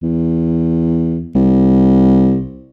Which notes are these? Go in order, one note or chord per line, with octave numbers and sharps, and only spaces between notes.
E2
C2